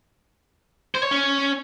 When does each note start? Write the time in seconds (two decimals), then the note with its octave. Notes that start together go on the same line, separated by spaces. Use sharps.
0.95 C5
1.03 C#5
1.11 C#4